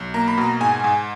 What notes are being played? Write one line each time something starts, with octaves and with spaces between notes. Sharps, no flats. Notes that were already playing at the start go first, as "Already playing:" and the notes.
Already playing: B1
A#3 A#5
B5
B2 A#5
G#2 G#5
G#2